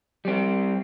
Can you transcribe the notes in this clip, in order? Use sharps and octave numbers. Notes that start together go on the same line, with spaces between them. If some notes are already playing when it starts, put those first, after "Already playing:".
G3 C4